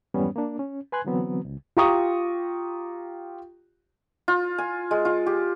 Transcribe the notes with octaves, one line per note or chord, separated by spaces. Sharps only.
F2 G#2 E3 G3 B3 C#4
A#3 D4
C#4
B4 G#5 C6 F#6 G#6
D3 E3 F#3 B3 C4
C#2
F4 G4 A#5 C#6 D#6
F4
G#5
G#3
F4
G4